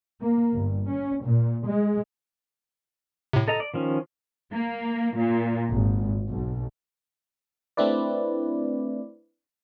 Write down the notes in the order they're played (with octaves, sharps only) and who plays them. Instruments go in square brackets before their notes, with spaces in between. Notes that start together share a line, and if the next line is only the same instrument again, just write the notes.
[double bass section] A#3
G1
C#4
A#2
G#3
[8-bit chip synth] A2 C3
[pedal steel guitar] A4 D#5 A#5
D5
D#3 F3 C#4
[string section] A#3
A#2
G#1
B1
[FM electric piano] A3 C4 D4 E4 B4 D5